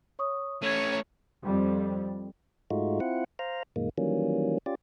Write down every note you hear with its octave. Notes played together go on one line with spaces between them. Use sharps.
C#5 C#6 D#6
A3 C#4 C#5 G#6 D#7
F2 G3
G#2 G#3 A3 D#4 F4 F#4
C4 E4 F4 F#5
C5 F5 A#5
F#2 A#2 D#3 G#3 A#3
D#3 E3 F#3 G3 A#3 C#4
C#4 F4 G4 D5